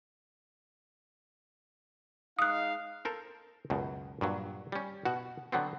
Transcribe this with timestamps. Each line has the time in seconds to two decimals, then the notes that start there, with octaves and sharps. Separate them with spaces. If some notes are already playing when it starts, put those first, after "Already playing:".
2.39 G#3 D#4 F5 D#6 F#6
3.05 A4 A#4 C5
3.70 C#2 F#2 B2
4.21 G2 A#2 F#3
4.72 G3 C#4
5.05 B2 F#4 F#5
5.52 D3 F#3 B3 C4